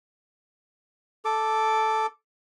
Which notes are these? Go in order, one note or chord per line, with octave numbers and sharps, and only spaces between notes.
A4 D6